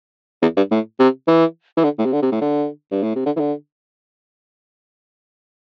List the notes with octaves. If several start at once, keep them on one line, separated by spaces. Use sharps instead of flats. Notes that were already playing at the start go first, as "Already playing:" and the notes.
E2
G2
A2
C3
E3
E3
D3
A2
C3
D3
C3
A2
D3
G2
A2
C3
D3
E3
D3